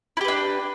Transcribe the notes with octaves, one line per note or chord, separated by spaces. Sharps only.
D4 E4 G4 B4